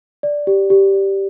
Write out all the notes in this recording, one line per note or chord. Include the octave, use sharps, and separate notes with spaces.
D5
G4
G4
D5